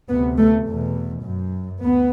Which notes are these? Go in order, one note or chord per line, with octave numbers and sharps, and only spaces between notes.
D2 C3 B3
A3
E2 B2
F#2
D2 B3